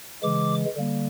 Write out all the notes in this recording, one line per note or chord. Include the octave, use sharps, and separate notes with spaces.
C#3 E3 G#3 D6
D3 G3 A#3